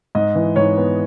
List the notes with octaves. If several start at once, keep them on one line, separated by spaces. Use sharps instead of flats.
G#2 D#5
E3
G#2 C#5
B3